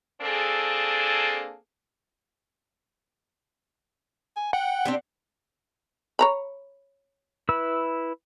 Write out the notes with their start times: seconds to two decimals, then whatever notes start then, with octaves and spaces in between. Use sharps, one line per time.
0.22 A#3 C4 D4 G#4 A4
4.36 G#5
4.53 F#5 G5
4.85 C4 D4 G4
6.19 C#5 A#5 B5
7.49 E4 B4 E6